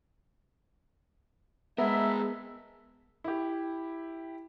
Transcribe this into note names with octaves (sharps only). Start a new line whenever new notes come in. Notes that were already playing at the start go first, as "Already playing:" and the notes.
G#3 B3 G#4 A#4 E5
E4 G4